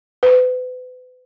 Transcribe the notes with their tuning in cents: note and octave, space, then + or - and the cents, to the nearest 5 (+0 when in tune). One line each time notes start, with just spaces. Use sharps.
B4 +35